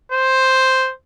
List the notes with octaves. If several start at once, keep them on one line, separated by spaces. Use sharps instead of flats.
C5